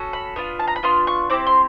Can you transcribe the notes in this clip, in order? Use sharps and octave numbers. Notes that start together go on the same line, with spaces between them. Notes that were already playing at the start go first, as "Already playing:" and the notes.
Already playing: C#4 F#4 A4
B5
B3 D4 F4
A5
A#5
B5
B3 D4 F4 C6
C#6
C4 E4 G4 D6
C6